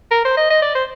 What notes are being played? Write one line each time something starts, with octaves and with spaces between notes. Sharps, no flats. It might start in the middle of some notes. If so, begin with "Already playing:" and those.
A#4
C5
D#5
D#5
D5
C5